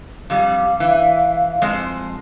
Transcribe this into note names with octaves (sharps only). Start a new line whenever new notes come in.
F2 G3 F5
E3
F2 G#3 C5